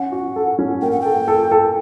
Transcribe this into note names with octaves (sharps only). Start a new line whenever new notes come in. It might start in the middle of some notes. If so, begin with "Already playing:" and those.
Already playing: C#4 F#5
F#4
A4
C#4
A#3 G5
F#5
A4 G5
A4
A4